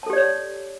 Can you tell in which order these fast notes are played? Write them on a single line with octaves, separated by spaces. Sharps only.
A5 A4 G4 D5 C#5